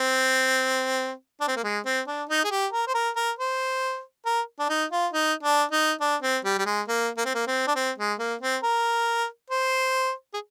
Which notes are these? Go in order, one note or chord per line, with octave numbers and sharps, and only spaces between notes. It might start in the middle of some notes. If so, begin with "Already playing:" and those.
Already playing: C4
D4
C4
A#3
G#3
C4
D4
D#4
G#4
G4
A#4
C5
A#4
A#4
C5
A#4
D4
D#4
F4
D#4
D4
D#4
D4
C4
G3
G3
G#3
A#3
A#3
C4
A#3
C4
D4
C4
G#3
A#3
C4
A#4
C5
G#4